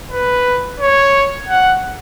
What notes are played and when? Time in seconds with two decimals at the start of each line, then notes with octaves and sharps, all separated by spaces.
0.12 B4
0.80 C#5
1.48 F#5